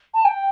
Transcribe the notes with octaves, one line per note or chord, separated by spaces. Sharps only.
A5
G5